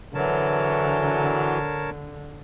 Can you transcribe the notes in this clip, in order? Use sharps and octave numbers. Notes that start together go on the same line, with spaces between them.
D3 E3 F#3 A#4 C#5 A5